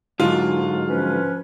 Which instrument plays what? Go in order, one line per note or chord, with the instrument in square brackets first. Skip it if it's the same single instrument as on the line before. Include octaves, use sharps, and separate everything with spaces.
[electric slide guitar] G#2 [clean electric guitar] D3 F#3 [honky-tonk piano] F4
[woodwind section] F3 C#4 B4